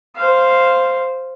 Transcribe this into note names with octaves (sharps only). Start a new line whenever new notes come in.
C5 F5